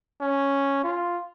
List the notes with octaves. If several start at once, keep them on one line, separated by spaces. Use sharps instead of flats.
C#4
F4